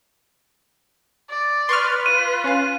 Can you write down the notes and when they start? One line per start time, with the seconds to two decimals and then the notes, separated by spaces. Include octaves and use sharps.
1.30 D5
1.69 B4 C6 C#6 F6
2.06 F4 D#7
2.44 C#4 F5